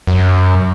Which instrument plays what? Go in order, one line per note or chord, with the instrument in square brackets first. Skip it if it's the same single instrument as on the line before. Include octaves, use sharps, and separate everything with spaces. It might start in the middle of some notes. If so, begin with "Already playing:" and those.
[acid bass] F#2